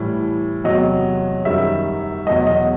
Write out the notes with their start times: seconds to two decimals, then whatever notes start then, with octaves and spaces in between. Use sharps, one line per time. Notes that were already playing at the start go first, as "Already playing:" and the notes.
Already playing: A2 E3 G3
0.64 E2 C3 F#3 D#5
1.45 F#2 D#3 G3 E5
2.27 E2 B2 F#3 D#5
2.47 D#5